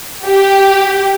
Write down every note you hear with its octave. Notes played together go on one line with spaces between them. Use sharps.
G4